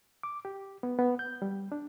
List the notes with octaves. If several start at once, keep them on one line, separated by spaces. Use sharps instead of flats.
D6
G4
B3
B3
G6
G3
D4